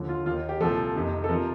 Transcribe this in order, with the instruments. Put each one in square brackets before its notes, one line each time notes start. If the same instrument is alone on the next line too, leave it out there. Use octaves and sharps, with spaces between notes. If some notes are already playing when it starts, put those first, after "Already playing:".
Already playing: [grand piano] D#2 D3 F3
F4
D#2 D#3 F4
G4
C2 A#2 F3 A4
F2 C3 D#3
A4
C3 F3 A#4